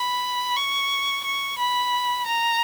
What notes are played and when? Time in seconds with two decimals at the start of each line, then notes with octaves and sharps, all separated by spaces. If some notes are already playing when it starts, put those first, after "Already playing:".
Already playing: B5
0.56 C#6
1.24 C#6
1.59 B5
2.26 A#5